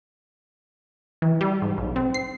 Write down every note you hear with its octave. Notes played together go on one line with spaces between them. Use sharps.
E3
G3
G#2
B1
C4
C7